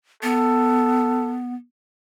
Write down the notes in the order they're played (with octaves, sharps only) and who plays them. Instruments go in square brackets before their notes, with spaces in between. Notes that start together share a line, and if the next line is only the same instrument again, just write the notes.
[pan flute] B3 [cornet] A4